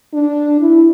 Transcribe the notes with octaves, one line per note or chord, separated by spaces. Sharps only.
D4
E4